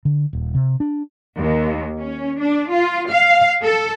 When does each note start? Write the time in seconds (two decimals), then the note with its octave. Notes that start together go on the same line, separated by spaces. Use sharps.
0.05 D3
0.33 D#1
0.55 C3
0.80 D4
1.37 D#2
1.98 C#4
2.39 D4
2.71 F4
3.11 F5
3.63 A4